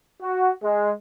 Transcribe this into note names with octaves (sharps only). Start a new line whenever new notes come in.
F#4
G#3